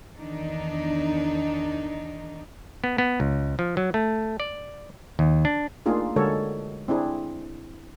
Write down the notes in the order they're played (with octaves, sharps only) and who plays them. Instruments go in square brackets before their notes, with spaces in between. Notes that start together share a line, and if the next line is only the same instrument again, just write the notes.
[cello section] E2 D#3 D4 D#4
[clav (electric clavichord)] B3
B3
C#2
F3
F#3
A3
D5
D#2
D4
[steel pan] A3 A#3 D4 D#4 F4 G#4
D3 G#3 F#4 A4 A#4 C#5
C4 D4 E4 G#4